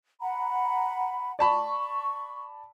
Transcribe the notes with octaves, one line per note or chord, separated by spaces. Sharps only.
F#5 A#5 B5
D5 A5 B5 C#6